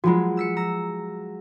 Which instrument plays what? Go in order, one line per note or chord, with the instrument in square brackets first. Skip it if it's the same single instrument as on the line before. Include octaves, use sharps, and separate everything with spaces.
[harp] F3 F#3 G#3 [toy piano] F4 F#4
[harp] E6 B6 C#7
A#5 E6